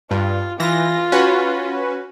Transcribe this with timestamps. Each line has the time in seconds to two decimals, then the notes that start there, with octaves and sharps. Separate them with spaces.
0.11 G2 F4
0.60 E3 F4 A#6
1.12 C#4 F#4 B4